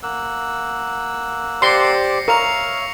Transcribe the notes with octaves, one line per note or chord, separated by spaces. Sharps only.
A#3 F#5 E6
G4 C5 D5 C6 A#6 C7 C#7
A#4 C#5 E5 F5 C#6 C#7 F7